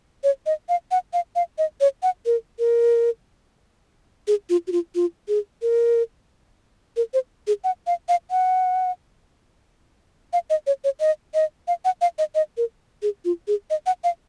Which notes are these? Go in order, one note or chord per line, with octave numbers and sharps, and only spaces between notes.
C#5
D#5
F5
F#5
F5
F5
D#5
C#5
F#5
A#4
A#4
G#4
F4
F#4
F4
F4
G#4
A#4
A#4
C5
G#4
F#5
F5
F5
F#5
F5
D#5
C#5
C#5
D#5
D#5
F5
F#5
F5
D#5
D#5
A#4
G#4
F4
G#4
D#5
F#5
F5